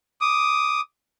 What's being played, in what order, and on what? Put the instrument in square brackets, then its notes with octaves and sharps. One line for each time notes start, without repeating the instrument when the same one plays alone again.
[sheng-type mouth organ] D6 D#6